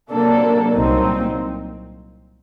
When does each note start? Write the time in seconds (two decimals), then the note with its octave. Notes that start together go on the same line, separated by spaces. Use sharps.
0.11 C3 F#3 A#3 D4 A4
0.73 C2 A#2 F#3 C4 D#4